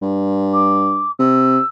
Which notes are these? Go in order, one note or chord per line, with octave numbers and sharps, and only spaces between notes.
G2
D6
C3 E6